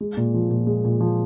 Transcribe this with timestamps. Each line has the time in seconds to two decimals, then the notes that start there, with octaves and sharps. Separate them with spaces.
0.01 G#3
0.17 A#2
0.34 F3
0.50 A#2
0.67 G#3
0.85 A#2
1.00 F3